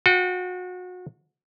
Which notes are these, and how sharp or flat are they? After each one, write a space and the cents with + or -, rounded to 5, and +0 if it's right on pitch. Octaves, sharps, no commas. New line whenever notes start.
F#4 -30 G5 -15